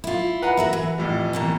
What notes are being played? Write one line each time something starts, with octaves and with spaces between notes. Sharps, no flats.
E4 F4
B4 F#5 A#5
F#4 A#4 E5
E3
F2 A2 G3
B2 E3 A#3